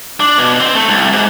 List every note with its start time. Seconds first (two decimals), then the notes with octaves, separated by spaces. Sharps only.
0.20 D4
0.38 B2
0.60 C4
0.75 A3
0.88 C2
1.13 G#2